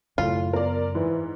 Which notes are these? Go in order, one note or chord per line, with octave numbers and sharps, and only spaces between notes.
F#2 A2 C#3 F4
B3 A#4 D5
G#2 E3